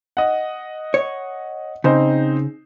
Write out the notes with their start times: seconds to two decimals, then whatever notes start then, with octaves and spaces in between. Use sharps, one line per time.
0.17 D#5 F#5
0.94 C#5
1.84 C#3 C4 D#4 C5